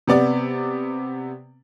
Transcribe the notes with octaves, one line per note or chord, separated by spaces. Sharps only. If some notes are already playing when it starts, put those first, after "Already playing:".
C3 B3 D5 D6